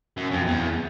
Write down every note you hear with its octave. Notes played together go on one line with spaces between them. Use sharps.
F#2
F2
E2